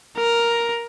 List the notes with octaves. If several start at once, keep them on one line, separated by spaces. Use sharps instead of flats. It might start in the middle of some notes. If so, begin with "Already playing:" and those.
A#4